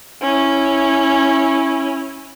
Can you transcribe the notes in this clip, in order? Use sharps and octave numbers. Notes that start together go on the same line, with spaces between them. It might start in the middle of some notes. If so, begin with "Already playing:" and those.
C#4 E4